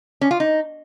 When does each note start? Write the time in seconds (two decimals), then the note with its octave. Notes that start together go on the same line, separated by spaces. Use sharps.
0.21 C#4
0.31 F4
0.40 D#4